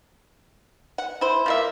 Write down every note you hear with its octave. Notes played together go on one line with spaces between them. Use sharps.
F#5
E4 C5
F3 A#3 E5